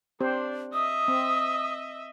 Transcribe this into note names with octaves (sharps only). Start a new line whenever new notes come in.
C4 D4 G4 C5
D#5 E5 D#6
C4